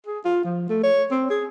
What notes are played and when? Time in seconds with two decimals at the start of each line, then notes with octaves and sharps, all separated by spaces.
0.06 G#4
0.25 F4
0.45 F3
0.69 A3
0.83 C#5
1.11 C4
1.30 G#4